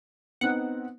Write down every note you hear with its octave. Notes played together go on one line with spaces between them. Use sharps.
B3 C4 D#4 F#5